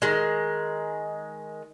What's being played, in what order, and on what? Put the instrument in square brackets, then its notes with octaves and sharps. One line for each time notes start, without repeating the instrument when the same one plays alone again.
[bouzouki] D#3 G#3